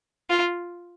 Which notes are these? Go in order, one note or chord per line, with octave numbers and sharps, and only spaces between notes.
F4